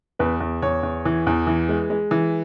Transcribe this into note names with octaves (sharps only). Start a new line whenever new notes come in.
E2 B4
E2
E2 C#5
E2
E3
E2
E3
G#3
G#3
E3